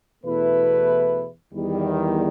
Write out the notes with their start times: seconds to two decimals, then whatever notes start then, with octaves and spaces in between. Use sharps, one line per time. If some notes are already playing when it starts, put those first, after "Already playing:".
0.24 E2 B2 A3 E4 B4
1.53 E2 D#3 G3